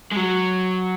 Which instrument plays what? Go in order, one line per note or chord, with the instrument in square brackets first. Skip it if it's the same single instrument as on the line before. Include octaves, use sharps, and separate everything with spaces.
[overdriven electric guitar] G#3
F#3